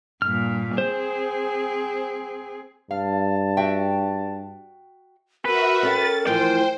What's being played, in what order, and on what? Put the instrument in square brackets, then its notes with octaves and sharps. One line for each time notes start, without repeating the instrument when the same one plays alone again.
[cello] G2 A#2 [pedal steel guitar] F6
[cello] C4 G#4 [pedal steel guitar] C5
[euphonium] G2 [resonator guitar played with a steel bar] F5 [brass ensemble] A5
[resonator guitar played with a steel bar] F#4 E5 G5
[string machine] F#4 E5 [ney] A#4 [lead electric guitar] B4
[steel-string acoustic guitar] C#4 A4 G5 [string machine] A6
[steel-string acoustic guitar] A2 E3 F3 [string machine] C5 [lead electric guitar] G5